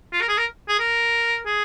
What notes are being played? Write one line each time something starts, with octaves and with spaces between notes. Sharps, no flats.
F4
A#4
G#4
A#4
G#4
A#4
G#4